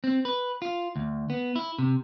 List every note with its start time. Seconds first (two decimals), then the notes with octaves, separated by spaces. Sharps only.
0.04 C4
0.25 B4
0.62 F4
0.96 D2
1.30 B3
1.56 E4
1.79 C3